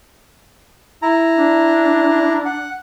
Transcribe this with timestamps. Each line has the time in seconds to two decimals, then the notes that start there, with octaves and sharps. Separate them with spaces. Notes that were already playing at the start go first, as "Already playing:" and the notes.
1.02 E4 A#5
1.38 D4
2.45 F#5